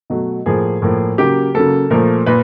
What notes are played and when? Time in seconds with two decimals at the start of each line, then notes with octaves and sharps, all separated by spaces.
0.10 B2 F#3 A3
0.46 A2 F3 A#3 G#4
0.82 A2 F3 A#3
1.18 C#3 F#3 A#3 G4
1.54 C#3 F#3 A#3 A4
1.90 A#2 F3 A3 A#4
2.26 A#2 B4